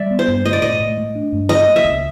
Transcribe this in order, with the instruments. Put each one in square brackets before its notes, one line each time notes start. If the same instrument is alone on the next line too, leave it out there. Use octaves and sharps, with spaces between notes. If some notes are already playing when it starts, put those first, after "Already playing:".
Already playing: [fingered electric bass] G3 [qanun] D5 E5
[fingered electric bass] B3
[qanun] C5
[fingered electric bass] G2
[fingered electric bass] A3 [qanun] D#5
[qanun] D5
[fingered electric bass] A2 [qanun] D#5
[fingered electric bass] A2
A3
D4
G2
[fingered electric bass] F#3 [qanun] D#5
[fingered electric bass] A#3
[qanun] E5
[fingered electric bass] C#2